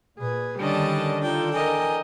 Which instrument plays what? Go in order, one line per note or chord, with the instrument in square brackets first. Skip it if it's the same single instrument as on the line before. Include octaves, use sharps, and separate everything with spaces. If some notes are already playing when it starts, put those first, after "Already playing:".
[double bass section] A#2 [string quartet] G#4 B4
[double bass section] D3 D#3 [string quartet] G3 C#4 A5 [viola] D4 D#5
[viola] D4 A4 [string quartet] D#4 G5 [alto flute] F4
[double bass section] E3 [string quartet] A#4 D#5 G5 [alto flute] G#5